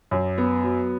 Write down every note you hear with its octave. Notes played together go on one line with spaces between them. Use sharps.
F#2
B3
F#3